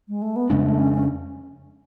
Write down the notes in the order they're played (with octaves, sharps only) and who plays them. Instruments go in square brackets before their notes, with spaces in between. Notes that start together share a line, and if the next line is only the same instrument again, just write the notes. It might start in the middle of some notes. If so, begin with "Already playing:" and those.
[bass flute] G#3
A3
B3
[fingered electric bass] F2 C#3 G#3 D4 [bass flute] C#4
[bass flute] A3
C#4
C#4